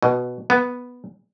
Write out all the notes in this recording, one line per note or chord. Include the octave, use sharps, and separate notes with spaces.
B2
B3